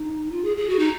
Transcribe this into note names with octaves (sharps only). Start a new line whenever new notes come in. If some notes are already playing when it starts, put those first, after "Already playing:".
Already playing: D#4
F4
G#4
G#4
F#4
D#4